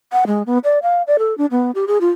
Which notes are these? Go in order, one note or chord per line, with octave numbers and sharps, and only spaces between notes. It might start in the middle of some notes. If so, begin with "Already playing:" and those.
F#5
G#3
B3
D5
F5
D5
A4
D4
B3
G4
G#4
F4